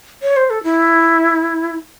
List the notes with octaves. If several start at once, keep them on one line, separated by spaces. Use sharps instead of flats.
C#5
C5
A4
E4